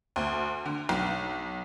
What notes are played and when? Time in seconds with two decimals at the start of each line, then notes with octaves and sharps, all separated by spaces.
0.16 D2
0.66 D3
0.89 B1